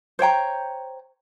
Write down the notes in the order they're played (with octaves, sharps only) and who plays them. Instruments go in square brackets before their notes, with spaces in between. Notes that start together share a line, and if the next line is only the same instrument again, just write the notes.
[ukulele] C5 C#5 G5 A#5